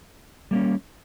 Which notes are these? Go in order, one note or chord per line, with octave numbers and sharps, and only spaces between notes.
G3 A#3 C#4